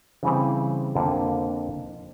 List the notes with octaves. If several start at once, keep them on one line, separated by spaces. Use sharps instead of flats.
C#3 E3 G3 C4
F2 D3 F3 A#3